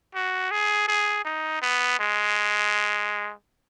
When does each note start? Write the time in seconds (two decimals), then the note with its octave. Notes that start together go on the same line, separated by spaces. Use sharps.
0.15 F#4
0.51 G#4
0.87 G#4
1.25 D#4
1.62 B3
1.99 G#3